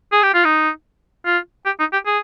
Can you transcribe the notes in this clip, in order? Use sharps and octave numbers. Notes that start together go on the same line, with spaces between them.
G#4
G4
F4
D#4
F4
G4
D#4
G4
G#4